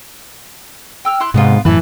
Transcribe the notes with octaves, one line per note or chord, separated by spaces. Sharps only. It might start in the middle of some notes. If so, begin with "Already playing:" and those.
G5 E6 F6
E4 C6 F#6
G#2 C3 B3 D4 F4
F#2 A2 E3 B4 A5